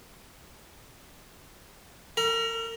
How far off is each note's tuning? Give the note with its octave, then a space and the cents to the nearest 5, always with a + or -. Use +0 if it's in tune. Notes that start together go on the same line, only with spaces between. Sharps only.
A#4 -45 A#5 +25